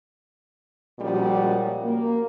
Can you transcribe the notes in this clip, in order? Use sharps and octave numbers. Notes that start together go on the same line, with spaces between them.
A#2 F3 G3 G#3 C#4 F#4
A#3